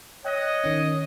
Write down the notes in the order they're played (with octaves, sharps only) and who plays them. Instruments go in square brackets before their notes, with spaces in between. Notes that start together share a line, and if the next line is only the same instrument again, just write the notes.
[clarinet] C#5 [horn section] D#5 [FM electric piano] G5 F#6
[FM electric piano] D#3 C#4